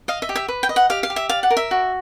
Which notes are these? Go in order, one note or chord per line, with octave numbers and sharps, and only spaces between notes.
D#5 F5
E5
G4
E5
B4
G5
D#5
F#5
G4 F5
F5
G4
E5
D5 F5
F#5
A#4
E5
F#4